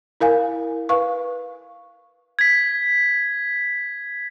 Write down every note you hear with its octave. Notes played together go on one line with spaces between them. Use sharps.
E4 A#4 F5 G#5
B4 F5 C#6
G#6 B6